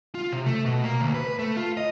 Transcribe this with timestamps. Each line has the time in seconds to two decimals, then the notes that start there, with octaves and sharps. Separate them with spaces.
0.15 F4
0.32 C3
0.46 A3
0.65 B2
0.84 A#3
1.01 D2
1.14 B4
1.26 B4
1.39 A3
1.57 F4
1.77 D#5